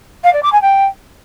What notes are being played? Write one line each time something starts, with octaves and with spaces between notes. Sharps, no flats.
F5
D5
D6
G#5
G5